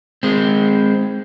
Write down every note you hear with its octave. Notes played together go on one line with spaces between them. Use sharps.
G#3 C4